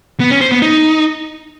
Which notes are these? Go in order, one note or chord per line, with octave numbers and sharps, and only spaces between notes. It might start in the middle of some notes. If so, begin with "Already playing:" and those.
B3
C#4
C5
B3
D#4